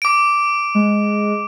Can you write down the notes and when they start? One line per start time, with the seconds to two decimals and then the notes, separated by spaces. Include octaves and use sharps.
0.02 D6 D7
0.75 G#3